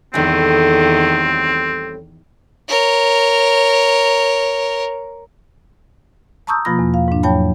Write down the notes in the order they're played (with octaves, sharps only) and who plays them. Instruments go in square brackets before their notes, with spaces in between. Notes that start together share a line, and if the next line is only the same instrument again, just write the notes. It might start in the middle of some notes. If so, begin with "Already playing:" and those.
[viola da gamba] E2 D#3 [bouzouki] A2 G3 [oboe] C4
[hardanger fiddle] A#4 C#5
[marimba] A5 A#5 C#6 D#6 E6 G6
B2 F3 A#3 F4 B5 A#6
E2
F5
G#2 D4
E2 F#3 C#5 G5 A5 B5